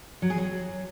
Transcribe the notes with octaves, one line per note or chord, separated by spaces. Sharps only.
F#3
G#4
F#3